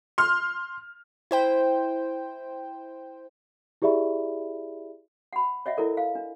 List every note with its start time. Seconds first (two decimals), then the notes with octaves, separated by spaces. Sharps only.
0.18 C6 F6
1.31 E4 C5 G5
3.82 E4 G4 G#4 D5 E5 B5
5.33 F#5 B5
5.66 C#5 D#5 E5 F#5
5.77 E4 A4 A#4 D5
5.97 F5
6.15 D4